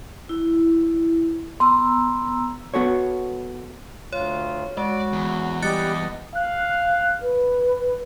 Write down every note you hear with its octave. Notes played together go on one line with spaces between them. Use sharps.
E4
B3 A#5 C6 E6
B3 F#4 A4 C#5
D2 F4 C#5
G#3 F#4 D5
E2
G3 D#5 F#6 A6 C#7
F5 F#6
B4